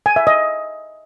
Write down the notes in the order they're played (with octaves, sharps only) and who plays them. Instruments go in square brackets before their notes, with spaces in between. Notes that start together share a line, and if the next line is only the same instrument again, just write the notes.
[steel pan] G#5
E5
D#5